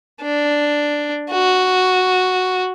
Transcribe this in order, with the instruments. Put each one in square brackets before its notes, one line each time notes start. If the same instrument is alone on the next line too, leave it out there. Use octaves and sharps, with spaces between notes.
[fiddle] D4
F#4